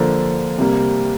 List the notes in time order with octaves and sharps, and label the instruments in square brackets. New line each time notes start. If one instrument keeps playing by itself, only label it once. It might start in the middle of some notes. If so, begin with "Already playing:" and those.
Already playing: [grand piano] D3 F3 A#3 D4 A4
C3 G3 A#3